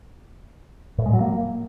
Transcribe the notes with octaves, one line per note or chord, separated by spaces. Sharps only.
A2
G#3
F#3
A#3